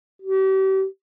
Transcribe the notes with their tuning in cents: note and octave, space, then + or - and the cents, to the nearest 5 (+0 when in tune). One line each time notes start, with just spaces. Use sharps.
G4 -40